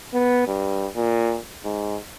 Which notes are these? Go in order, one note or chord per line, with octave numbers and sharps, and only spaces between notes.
B3
G2
A#2
G#2